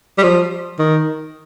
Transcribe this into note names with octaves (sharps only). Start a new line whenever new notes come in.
G3
F3
D#3